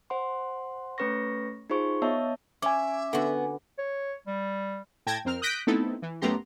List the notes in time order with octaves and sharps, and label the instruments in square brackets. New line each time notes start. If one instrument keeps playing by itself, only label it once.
[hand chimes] C5 F#5 C6
A3 C#4 B4 C#5 C#6 A#6
D#4 F4 G#4 C5 C#6
B3 C#5 D#5 E5 A5
[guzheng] C#4 [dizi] E5 [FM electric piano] G#5 D6
[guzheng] D3 F#4 [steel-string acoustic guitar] B3
[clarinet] C#5
G3
[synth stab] A2 G5 A5 G#6 A#6
F2 C4 A#4 F6
D#6 F#6 G6 A#6 B6 D7
A3 B3 C4 D#4 E4 A4
E3
F#2 A3 B3 G4 A#5 C6